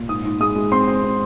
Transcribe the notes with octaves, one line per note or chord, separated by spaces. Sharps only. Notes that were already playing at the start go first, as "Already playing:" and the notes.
Already playing: A#2
G#2 D#6
G#2
G#3 D#6
G#3
C4 C6
C4
C4